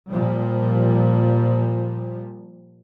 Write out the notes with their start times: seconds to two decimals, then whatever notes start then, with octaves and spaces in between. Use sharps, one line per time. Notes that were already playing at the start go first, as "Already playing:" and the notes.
0.11 A#2 F3 G3